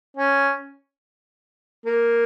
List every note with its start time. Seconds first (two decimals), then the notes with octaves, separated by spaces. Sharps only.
0.17 C#4
1.86 A#3